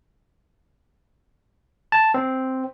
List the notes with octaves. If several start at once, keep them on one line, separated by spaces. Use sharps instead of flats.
A5
C4